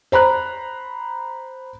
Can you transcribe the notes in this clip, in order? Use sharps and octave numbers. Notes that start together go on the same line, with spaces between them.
C5 A#5 B5 F#6